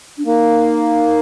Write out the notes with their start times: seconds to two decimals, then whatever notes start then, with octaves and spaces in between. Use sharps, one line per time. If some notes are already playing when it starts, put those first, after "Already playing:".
0.18 D4
0.26 A#3 D#4